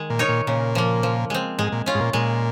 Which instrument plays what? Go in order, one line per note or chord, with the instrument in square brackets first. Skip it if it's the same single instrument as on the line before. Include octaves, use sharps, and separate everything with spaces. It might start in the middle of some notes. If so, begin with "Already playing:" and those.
Already playing: [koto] D#3 G#3
[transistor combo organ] A#2
[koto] D#4 A#4 C#5
[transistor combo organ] A#2
[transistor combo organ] A#2 [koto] C#3
[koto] F3 A#3
F3
G#3 C4
[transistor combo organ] G#2 [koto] G#3
[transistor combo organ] A#2
[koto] C#4 F4
[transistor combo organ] G#2
A#2
[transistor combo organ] A#2 [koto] G#3